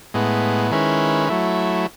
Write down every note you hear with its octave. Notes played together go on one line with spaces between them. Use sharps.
A2 G#3 B3
D#3 G#3 C#4 E4 B4
F#3 A3 E4